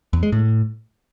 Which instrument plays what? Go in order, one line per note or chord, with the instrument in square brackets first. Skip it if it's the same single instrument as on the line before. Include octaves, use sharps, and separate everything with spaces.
[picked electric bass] E2
G#3
A2